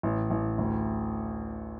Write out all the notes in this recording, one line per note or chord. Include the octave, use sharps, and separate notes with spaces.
A1
A1
D2